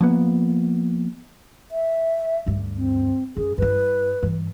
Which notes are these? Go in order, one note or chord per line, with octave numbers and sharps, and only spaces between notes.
F3 A#3 B3
E5
D2 G2
C4
F#2 G#4
G2 E4 B4
G2 E3